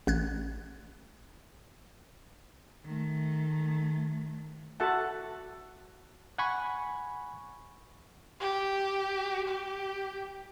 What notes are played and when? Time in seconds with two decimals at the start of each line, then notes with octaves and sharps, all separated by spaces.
0.07 A1 F#6 G#6
2.84 D#3 A3
4.80 F#4 A4 E5 F#5 A5
6.38 F#5 G#5 B5 C#6
8.40 G4
9.47 G4